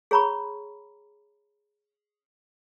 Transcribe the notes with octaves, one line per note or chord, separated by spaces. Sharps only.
G#4 C#5 A#5 B5 C#6